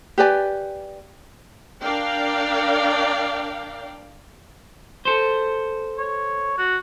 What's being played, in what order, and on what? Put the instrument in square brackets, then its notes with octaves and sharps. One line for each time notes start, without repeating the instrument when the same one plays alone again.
[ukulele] G4 B4 D5 G#5
[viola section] D4 A#4 D5 F5 G5
[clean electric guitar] A4 C5
[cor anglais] C#5
F#4